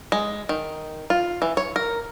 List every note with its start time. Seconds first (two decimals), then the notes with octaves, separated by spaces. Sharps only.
0.12 G#3
0.49 D#3
1.10 F4
1.42 E3
1.57 C#5
1.76 A#4